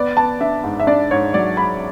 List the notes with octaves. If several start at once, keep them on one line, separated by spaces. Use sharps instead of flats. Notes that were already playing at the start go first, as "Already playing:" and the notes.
Already playing: B3 D5
B3 A5
D4 E5
G#2
E5
D4 D5
G#2 C#5
F#3 D5
G#2 B5